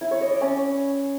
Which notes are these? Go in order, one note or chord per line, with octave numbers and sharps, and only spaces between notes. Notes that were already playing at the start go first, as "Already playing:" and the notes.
E4
C#5
D#5
D5
C#4